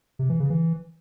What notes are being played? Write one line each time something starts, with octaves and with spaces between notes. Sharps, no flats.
C3
E3
C#3
E3